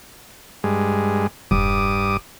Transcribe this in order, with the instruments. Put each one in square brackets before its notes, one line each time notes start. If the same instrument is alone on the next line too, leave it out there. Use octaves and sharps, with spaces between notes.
[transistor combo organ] G2 G#3
[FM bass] E1 [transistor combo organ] G2 D6 D#6